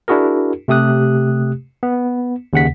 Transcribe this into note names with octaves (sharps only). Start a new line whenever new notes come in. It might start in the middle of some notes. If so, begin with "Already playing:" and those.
D4 E4 F#4 G#4 A#4
C3 A3 G4 D#6 F#6
B3
D#2 C#3 F#5 B6